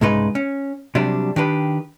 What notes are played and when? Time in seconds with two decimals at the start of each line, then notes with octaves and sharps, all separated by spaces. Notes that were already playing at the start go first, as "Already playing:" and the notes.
0.01 C2 G#2 C#3 G#3 D#4 B4
0.35 C#4
0.95 C3 F#3 G3 D4
1.36 D#3 D4 G4 B4